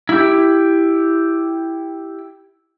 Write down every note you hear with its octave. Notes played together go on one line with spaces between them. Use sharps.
E4 G4